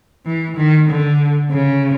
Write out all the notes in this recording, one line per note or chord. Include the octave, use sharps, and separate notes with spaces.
E3
D#3
D3
C#3